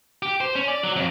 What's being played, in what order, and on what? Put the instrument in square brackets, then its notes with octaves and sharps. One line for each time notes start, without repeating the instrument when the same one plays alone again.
[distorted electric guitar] G4
C5
C#4
D5
F#3
F2